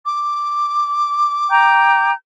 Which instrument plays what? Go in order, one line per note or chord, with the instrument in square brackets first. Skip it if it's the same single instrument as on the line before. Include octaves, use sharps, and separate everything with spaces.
[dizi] D6
[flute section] G5 A#5 G6